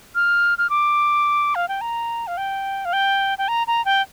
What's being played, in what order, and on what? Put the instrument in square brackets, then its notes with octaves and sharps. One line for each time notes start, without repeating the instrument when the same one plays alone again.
[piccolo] F6
F6
D6
F5
G5
A#5
F5
G5
F5
G5
G5
A#5
A#5
G5